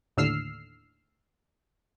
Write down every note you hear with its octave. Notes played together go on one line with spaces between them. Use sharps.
D#2 A2 D3 E6 F6 C7